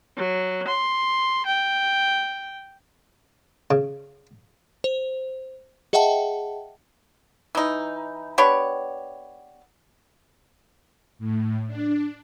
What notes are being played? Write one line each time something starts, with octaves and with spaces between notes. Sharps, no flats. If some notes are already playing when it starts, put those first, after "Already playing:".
F#3
C6
G5
C#3
C5
G#4 D#5 E5 F#5 G5 A5
E3 D#4
B3 D4 G4 C#5
A2
D4